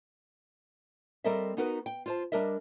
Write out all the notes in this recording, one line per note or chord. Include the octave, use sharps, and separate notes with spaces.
G3 C4 A4 A#4 D#5 E5
B3 D#4 F#4 A#4 B4
G5
F4 C5 A5
G3 D4 A#4 D#5 E5